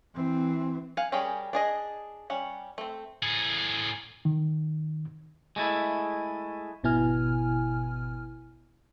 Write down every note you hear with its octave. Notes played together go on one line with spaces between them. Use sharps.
E3 C4
F5 F#5 G#5
G3 C#4 G#4 A#4 G5
D4 G#4 D#5
G3 C#4 F#5
A3 C4
A2 G#4
D#3
G#3 A3 E4
G#1 B2 B3 E4 G#5 F6